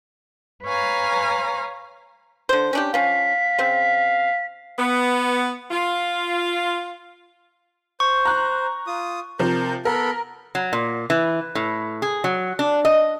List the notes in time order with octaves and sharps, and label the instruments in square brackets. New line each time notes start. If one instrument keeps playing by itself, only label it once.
[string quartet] B4 C#5 F5 G#5 A#5
[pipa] D3 C5
C#4 D4 G4
[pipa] F3 C#4 [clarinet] F5 [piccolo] B6
[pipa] C#3 C4
[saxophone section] B3
F4
[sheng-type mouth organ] C5 [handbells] C#6
[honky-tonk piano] A#5 F#6
[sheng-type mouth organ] F4 D#6
[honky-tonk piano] C3 F3 [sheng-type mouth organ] A#4 G6
[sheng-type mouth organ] B3 A4 B5 [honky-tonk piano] A#4
[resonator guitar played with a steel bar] F#3
A#2
E3
A2
G#4
F#3
D4
D#5